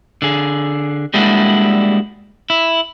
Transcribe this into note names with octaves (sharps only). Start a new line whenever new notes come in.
D3 G#4
G3 G#3 A#3 D4 E4 F#4
E4